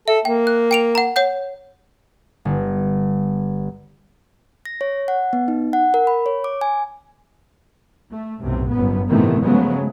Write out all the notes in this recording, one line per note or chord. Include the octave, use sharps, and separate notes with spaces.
A4 E5
A#3 G5
F#6
G5 D7 F7
F#5 A#5
C#5 F#5 G6
G1
A#6
C#5
F#5
B3
D#4
F#5
A#4
B5
C#5
D6
G#5
A3
B1 F#2 A2 C3
G1 F#2 B3
A2 C3 D#3 E3 A3 B3
C#3 F3 F#3 G#3 A3 B3